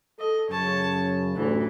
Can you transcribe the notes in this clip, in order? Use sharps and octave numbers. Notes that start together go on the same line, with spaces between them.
A4 D#5
F#2 C#3 C#5 A5
A1 D2 E3